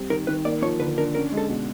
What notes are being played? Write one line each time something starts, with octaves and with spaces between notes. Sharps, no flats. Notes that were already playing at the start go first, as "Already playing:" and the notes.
Already playing: G3 C4
D#3 A#4
D#3 B4
A#3 D5
F3 C#5
D3 B4
D4 A#4
C#4 A#4
G#3
A4
B2